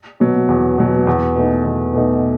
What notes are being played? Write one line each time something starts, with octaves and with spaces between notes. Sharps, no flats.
B2 F#3
E2
B2 F#3
E2
B2 A3 D#4
E2
B2 A3 D#4